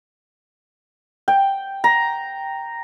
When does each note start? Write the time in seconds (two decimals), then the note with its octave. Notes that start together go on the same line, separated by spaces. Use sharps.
1.28 G5
1.84 A#5